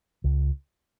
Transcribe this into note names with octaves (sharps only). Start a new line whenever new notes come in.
C#2